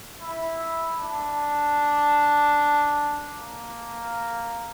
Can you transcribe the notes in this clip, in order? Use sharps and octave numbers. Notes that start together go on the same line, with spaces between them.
E4
D4
A#3